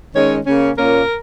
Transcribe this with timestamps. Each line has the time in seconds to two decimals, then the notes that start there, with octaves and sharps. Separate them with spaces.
0.14 D#3 G#3 C#4 C#5
0.46 C#3 A#3 C#4
0.77 A#2 A#3 C#4 A#4